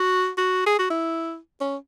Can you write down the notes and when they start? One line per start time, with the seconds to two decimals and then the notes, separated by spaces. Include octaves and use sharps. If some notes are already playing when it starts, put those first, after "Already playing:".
Already playing: F#4
0.37 F#4
0.66 G#4
0.79 F#4
0.90 E4
1.61 C#4